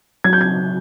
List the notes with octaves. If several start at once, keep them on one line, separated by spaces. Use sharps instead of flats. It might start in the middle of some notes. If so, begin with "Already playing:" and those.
F#3 G#6
G6
G#6